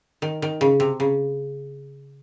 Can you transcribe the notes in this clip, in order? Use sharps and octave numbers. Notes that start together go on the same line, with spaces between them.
D#3
D#3
C#3
C3
C#3